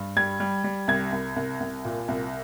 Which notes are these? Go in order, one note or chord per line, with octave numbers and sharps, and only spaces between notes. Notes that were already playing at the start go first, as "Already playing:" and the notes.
Already playing: G2
G3 G#6
G3
G3
C2 G#6
C2
C2
C2
A#2
C2